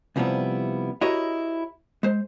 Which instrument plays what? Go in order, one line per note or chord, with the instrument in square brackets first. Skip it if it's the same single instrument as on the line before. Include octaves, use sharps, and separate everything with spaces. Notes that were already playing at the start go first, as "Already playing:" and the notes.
[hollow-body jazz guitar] C2 C3 F3 G3 B3 E4
E4 F#4 G4 A#4 C#5 D#5
G#3 C5